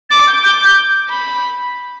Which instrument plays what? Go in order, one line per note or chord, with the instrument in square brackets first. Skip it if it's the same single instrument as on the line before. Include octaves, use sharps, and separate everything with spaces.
[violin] D6 [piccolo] A6
[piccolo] G6
[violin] D6 [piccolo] G6
[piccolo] G6
[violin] B5